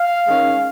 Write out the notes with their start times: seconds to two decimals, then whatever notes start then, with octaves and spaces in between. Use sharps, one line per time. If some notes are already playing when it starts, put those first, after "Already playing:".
Already playing: F5
0.26 D#3 G#3 C#4